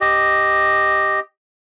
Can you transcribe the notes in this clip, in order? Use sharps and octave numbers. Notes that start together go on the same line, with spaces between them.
G4 D#5